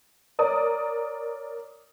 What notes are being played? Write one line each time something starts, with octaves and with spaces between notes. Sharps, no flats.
A#4 C#5 D5 D#6